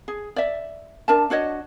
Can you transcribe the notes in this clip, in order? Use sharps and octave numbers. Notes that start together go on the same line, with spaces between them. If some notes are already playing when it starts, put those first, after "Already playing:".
G#4
D5 E5
D4 A#4 E5 A5
D4 F#4 C#5 D#5